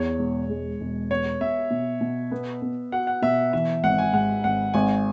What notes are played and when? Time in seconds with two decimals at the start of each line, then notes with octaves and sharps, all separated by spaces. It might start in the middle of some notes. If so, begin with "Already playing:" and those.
Already playing: E2 C#5
0.19 E1
0.49 G#3
0.81 E1
1.11 B3 C#5
1.41 B3 E5
1.71 B2
2.01 B2
2.32 B3
2.62 B3
2.92 F#4 F#5
3.07 F#5
3.22 B2 E5
3.53 E3 E5
3.83 G#1 F#5
3.98 G#5
4.13 G#2 F#5
4.44 G#1 F#5
4.74 G#1 G#5